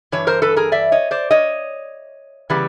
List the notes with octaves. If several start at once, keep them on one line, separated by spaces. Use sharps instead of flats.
G2 E3 C#5
A#4 C5
A4 B4
G#4 A#4
D5 E5
C#5 D#5
C5 D5
C#5 D#5
C#3 E3 G3 B3